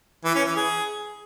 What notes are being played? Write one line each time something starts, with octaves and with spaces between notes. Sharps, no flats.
E3
C#4
E3
G#4